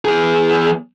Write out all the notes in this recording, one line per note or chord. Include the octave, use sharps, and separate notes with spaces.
E2 G#4